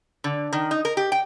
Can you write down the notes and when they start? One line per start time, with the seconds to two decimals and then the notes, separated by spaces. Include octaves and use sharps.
0.24 D3
0.53 D#3
0.71 D#4
0.85 A#4
0.97 G4
1.12 G5